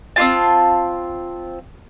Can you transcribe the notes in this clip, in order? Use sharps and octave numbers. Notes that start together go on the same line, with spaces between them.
C4 D4 F4 A5